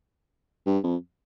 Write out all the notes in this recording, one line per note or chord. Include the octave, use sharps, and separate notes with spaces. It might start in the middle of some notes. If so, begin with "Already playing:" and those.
G2
F2